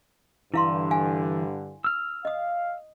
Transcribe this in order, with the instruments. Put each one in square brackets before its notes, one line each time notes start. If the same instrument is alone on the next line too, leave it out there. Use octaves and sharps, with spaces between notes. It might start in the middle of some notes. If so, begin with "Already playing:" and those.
[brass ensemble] G2 D3 [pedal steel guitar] E3 [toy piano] E4 F5 C6
[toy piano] F5 G#5
[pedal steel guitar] E6 F6
[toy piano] D#5 D#6 [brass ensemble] F5